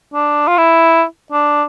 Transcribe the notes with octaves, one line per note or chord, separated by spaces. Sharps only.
D4
F4
E4
D4